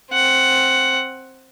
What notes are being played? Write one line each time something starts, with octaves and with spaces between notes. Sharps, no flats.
C4 F#5